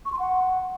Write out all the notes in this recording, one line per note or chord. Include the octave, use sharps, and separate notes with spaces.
C#6
C6
F#5